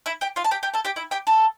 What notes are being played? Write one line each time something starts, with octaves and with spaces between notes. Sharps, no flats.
E4 E5
G4 G5
F4 F5
A5
G4 G5
G4 G5
A4 A5
G4 G5
E4 E5
G4 G5
A4 A5